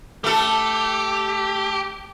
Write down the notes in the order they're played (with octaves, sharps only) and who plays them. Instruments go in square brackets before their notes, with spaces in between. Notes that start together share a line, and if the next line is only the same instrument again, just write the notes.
[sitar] A3 A4 [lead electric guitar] G4